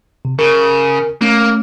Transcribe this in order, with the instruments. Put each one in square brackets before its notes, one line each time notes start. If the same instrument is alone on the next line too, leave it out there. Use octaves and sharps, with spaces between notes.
[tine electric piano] C3
[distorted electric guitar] C#3 [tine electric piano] A#4
[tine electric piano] A3 C#4 [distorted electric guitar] A#3